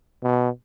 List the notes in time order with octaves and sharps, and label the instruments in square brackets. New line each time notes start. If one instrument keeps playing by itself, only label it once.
[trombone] B2